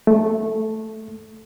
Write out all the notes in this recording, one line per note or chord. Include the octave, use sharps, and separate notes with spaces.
A3